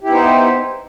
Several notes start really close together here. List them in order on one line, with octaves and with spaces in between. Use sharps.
G4 E4 B3 D#4 C5